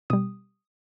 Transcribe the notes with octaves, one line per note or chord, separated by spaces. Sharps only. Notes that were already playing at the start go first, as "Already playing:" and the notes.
B2 G3 D#6